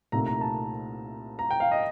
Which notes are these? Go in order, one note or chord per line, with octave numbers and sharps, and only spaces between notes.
C2 A#2 A3 D#4 A#5
A#5
A5
A#5
G5
F5
D#5